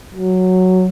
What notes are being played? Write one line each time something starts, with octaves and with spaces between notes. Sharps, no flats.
F#3